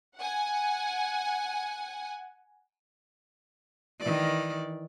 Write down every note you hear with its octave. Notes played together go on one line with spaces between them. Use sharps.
F#5 G#5
D#3 E3 D5